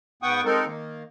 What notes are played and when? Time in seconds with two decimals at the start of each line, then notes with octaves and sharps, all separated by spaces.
0.23 G#2 B3 F#5 G5 C#6 D#6
0.45 G#3 C4 D#4 A4 A#4
0.66 D#3 A#3